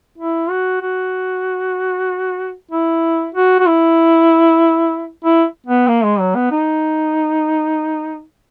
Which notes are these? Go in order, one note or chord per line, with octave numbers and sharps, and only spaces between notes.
E4
F#4
F#4
E4
F#4
F#4
E4
E4
B3
A#3
G#3
F#3
B3
D#4